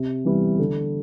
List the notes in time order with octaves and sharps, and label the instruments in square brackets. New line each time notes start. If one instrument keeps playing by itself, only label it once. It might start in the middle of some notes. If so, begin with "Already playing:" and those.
Already playing: [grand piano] C3
E3 G3 B3
D3